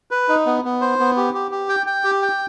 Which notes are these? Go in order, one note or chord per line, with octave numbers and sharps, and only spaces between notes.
B4
D#4
B3
B3
C5
B3
G4
G4
G4
G5
G5
G4
G5